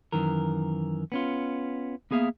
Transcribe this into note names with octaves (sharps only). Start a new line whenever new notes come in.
F#2 D#3 E3 A#4
B3 C#4 F4
A#3 B3 G#4 E5 F5